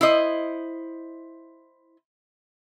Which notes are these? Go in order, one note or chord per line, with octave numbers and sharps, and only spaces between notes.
E4 C5 D#5